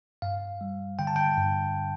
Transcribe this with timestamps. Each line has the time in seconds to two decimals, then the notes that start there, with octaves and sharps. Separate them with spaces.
0.22 G2 F5
0.61 G3
0.99 D3 G5
1.07 A5
1.16 G5
1.37 G2